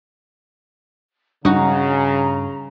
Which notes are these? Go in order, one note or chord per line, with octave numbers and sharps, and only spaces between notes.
G2 C#3 D#4 F#4 A#5